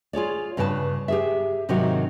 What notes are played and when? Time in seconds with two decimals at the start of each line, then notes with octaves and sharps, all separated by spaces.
0.13 F4 G#4 C#5 D5
0.57 G2 C#3 B4 G5 A5
1.08 G4 G#4 E5
1.69 G#2 C3 D#3 F#3 D#4 F#4